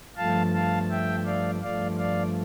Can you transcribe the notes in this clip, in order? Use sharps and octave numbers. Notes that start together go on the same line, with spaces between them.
G2 F3 A3 F5 A5
F5 A5
E5 G5
D5 F5
G2 F3 A3 D5 F5
D5 F5